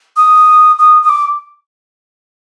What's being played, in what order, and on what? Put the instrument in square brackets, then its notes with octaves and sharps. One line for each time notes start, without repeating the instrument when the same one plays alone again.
[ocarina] D#6
D#6
D#6
D6